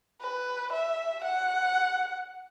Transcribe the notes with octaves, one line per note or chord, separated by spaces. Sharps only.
B4
E5
F#5